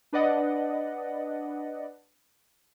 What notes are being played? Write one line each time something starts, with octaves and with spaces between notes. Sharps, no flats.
D4 B4 D5 D#5 F#5